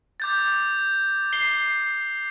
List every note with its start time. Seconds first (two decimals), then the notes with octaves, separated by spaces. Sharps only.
0.20 D6 G6 A6
1.33 C7 G7